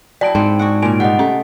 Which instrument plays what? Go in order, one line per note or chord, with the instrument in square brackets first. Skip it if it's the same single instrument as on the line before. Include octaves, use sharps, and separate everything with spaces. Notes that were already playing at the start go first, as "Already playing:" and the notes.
[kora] F#3 E4 [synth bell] D5 A5 D7 [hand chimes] G5
[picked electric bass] G#2 [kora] C4 D4
[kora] F#4 G#4 F#5
[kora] A#2 C#3 [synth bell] G#5 D7
[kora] C3 G3 [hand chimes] D#5 F#5
[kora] A3 [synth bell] C#4